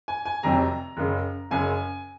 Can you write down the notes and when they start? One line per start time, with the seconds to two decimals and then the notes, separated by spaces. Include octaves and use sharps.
0.08 G#5
0.25 G#5
0.43 F1 F2 C3 F#3 A#5
0.97 F#1 F#2 C#3
1.50 F#1 F#2 C#3 G#5